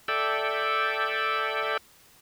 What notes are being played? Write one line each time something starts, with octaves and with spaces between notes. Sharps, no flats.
A4 D5 E5 G5